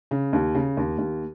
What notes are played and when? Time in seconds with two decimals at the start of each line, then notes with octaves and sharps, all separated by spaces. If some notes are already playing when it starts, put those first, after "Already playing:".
0.11 C#3
0.33 D#2
0.55 C#3
0.77 D#2
0.98 D#2